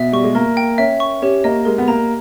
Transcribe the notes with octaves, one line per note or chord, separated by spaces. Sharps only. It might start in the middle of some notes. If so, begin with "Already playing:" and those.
Already playing: B2 E5
G3 C#6
G#3
A#3 A#4
G5
C#4 E5
C#6
C#4 G4
A#3 D#5
G#3 A#4
B3
A#3 A#5